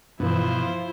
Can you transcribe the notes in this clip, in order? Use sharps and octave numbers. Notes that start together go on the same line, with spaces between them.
G2 B2 E3 F3 E4 F4 C5